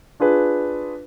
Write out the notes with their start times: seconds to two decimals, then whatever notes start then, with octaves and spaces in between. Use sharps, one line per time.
0.20 D4 F4 G#4 B4